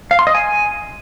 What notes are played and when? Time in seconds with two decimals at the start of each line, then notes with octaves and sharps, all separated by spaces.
0.11 F5
0.19 C6
0.27 D#5
0.35 G#5